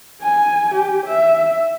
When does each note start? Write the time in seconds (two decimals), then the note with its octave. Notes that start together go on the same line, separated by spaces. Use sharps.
0.23 G#5
0.74 G4
1.06 E5